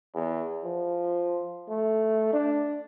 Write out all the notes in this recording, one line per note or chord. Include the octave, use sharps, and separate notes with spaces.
E2
F3
A3
D4